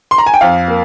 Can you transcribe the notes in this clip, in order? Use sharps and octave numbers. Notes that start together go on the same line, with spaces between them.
C6
A#5
G#5
G5
F2 F5
A#3